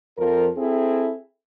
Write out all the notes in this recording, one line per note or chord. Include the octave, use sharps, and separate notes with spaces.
F2 F3 A#4
C4 E4 G#4 A4